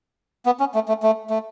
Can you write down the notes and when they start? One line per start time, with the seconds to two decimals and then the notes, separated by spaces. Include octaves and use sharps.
0.46 B3
0.60 C#4
0.75 A3
0.88 A3
1.03 A3
1.30 A3